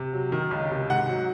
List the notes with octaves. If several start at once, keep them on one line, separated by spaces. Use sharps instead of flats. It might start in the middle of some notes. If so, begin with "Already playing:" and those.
Already playing: C3
F#3
D#3
C#2
C3
G#2 F#5
F#3